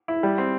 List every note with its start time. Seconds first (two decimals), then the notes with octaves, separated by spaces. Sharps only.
0.08 E4
0.23 G3
0.38 C4